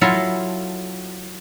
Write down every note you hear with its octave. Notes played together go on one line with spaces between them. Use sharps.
F#3 E4 F4 A4